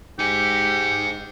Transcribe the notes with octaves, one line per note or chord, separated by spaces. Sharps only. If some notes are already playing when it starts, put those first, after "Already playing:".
G#2 D#4 G4 G#5 C#7